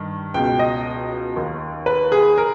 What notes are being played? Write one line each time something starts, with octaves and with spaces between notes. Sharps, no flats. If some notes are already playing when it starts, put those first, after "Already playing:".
Already playing: G2 D#3
C#2 B2 G5
D#5
D#2 D#3
B4
G#4
A#4